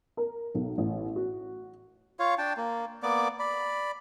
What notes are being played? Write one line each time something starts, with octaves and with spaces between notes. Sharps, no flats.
A#4
B1
A1
F#4
F4 C#5 F5
D4 G5 A5
A#3
A#3 B3 D5 D6
D5 B5